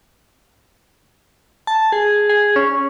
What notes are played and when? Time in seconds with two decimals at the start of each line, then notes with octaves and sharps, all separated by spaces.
1.67 A5
1.92 G#4
2.29 G#4
2.56 C#4